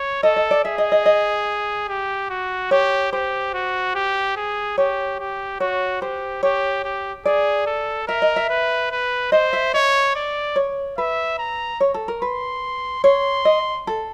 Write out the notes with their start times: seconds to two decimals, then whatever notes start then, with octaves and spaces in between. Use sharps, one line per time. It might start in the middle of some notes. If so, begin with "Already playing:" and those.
Already playing: C#5
0.23 A4 D#5
0.36 D#5
0.51 D5
0.65 G#4 E5
0.78 D#5
0.92 D#5
1.06 D#5
1.88 G4
2.30 F#4
2.71 G4 C#5
3.12 G4 C5
3.54 F#4
3.95 G4
4.37 G#4
4.78 G4 C#5
5.20 G4
5.60 F#4 C#5
6.01 G4 C5
6.43 G4 C#5
6.85 G4
7.25 G#4 D5
7.67 A4
8.08 A#4 E5
8.22 D#5
8.36 E5
8.50 B4
8.92 B4
9.32 C5 D#5
9.53 E5
9.74 C#5 D#5
10.16 D5
10.56 C#5
10.98 B4 E5
11.39 A#5
11.80 C#5
11.94 A4
12.08 A#4
12.22 B4 C6
13.04 C#5 C6
13.45 D#5
13.87 A4